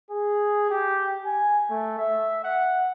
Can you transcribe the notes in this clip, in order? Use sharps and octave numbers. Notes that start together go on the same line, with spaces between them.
G#4
G4
G#5
A3
E5
F#5